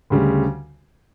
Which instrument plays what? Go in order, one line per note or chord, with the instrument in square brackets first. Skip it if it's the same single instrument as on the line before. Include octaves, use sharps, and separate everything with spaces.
[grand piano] D2 C#3 G3